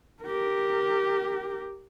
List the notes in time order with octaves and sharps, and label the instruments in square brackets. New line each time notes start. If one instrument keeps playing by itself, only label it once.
[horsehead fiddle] G4 A#4